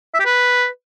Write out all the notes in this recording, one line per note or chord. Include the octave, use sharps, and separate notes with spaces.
E5
G4
B4